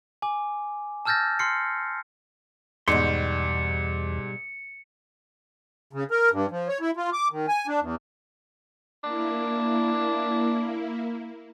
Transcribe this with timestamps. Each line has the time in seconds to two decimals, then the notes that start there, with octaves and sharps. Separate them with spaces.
0.22 G#5 D6
1.05 A5 E6 F6 G6 A6 A#6
1.39 C6 F6 C7 C#7
2.88 E2 G#2 B2 G3 C6 C#7
5.93 C#3
6.11 A#4
6.32 G2
6.51 F3
6.68 C#5
6.81 E4
6.97 F4
7.13 D6
7.31 D#3
7.48 G#5
7.67 D4
7.81 E2
9.04 A#3 D4 E4